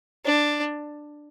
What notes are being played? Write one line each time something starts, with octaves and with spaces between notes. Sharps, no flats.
D4